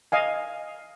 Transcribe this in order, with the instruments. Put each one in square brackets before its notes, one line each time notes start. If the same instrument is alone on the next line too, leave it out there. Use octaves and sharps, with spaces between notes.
[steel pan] D#5 F5 G#5